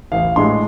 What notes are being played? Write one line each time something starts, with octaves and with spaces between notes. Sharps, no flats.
A1 F5
A2 G#3 D4 C6